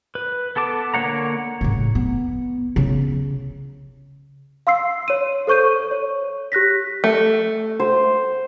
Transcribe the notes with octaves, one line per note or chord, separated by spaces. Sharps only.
B4
B3 A4 A5 D6
D3 A#3 C#5 F#5 A#5
A2 C#3
B3
C#3
F5 C6 E6 C7
C#5 D#7
A4 C5 C#6 G6 D#7
C#5
G4 F#6 A#6 B6
A3
C5